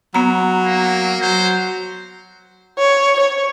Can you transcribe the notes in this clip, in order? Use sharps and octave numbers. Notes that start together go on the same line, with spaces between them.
F#3 B3 A#5
A#3
F#3 C5
C#5
C#5